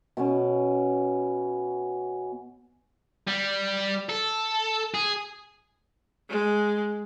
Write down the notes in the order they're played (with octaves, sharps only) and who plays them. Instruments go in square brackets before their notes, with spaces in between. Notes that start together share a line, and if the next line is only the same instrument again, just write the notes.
[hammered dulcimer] B2 B3 C#4
[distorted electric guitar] G3
A4
G#4
[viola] G#3